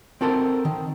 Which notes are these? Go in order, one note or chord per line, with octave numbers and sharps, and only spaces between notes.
C4 F#4 A4 A#4 C5
D#3